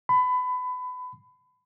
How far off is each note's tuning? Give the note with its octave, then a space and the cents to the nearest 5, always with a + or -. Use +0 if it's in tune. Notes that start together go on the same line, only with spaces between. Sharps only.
B5 +25